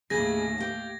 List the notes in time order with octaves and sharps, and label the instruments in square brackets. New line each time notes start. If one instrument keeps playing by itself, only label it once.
[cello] D#2 A2 [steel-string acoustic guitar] C#3 G#4 [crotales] G#6 A#6
[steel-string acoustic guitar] G4 F5